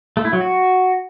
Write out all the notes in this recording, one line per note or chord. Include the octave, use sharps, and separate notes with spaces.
A3
E4
F#3
F#4